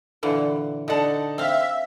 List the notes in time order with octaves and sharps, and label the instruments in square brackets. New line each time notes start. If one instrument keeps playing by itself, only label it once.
[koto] A#2 D3 E3
[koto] D3 F#5 [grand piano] D#4 D5 A5
[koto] C4 F5 [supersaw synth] E5